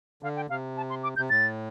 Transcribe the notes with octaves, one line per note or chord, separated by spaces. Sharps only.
D3 F5
G5
C3 F5
A5
C6
D6
C3 G6
A2 A6